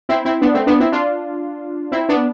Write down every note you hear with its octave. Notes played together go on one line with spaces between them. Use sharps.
C4 E4
C4 E4
B3 D4
A3 C4
B3 D4
C4 E4
D4 F4
C4 E4
B3 D4